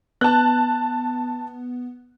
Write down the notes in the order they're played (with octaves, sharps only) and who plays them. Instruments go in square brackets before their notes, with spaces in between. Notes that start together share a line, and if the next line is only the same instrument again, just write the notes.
[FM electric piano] B3 [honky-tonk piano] A5 F#6